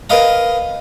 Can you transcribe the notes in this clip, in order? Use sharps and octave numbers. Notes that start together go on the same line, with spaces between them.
A#4 B4 D#5 F5 A#5